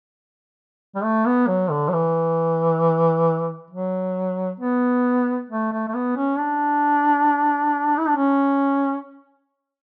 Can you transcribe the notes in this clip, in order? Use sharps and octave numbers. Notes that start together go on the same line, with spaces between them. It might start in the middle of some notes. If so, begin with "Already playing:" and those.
G3
A3
B3
F#3
D3
F#3
E3
F#3
B3
A3
A3
A3
B3
C#4
D4
E4
D4
C#4